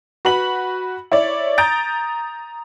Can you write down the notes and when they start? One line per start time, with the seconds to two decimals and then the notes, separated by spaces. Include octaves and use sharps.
0.25 F#4 B4 B5 F#7
1.12 E4 C#5 D5
1.58 A#5 D#6 G6 A6 D7